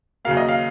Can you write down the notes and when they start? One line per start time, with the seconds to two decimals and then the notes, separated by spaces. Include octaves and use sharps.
0.25 D#2 C#3 F#3 A#3 F5
0.37 D#5
0.48 F5